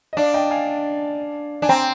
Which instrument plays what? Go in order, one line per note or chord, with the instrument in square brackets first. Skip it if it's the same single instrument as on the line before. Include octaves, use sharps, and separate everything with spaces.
[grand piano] D#5
[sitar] D4 [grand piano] D5 F5
[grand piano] D#5 G5
F5 G#5
[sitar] D4 [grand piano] G#5
[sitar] C4 [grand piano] G5 A#5